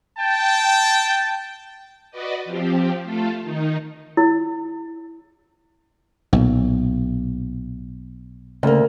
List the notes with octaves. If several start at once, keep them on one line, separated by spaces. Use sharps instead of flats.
G5 A5
F#4 B4 D5 D#5
F3 C4 G4
A3 F4 A4
D#3 D#4
E4
B1 A#2
D2 C#3 A#3